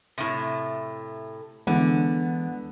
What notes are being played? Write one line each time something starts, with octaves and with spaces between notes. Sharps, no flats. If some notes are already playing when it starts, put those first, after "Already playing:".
A2 C3
D3 E3 G#3 B3